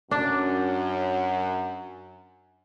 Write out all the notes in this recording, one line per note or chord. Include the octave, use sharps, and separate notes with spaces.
F#2 D4